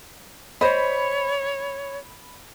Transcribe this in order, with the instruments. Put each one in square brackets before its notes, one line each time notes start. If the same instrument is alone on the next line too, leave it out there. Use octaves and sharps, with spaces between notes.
[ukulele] C5 D#5 [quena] C#5 [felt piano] B5